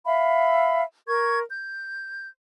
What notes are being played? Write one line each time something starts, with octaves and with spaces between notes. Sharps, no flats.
E5 F5 B5
A#4 C#6 G#6
G6